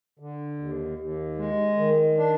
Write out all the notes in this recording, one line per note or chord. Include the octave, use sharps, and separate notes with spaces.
D3
D#2
D#2
G#3
D#3
D4